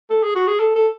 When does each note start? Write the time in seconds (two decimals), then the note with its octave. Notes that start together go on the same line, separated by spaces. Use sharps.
0.10 A4
0.23 G#4
0.35 F#4
0.48 G#4
0.59 A4
0.76 A4